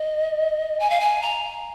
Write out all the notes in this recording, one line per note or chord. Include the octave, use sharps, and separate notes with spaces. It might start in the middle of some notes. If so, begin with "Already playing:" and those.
Already playing: D#5
G#5
F5
G#5
A#5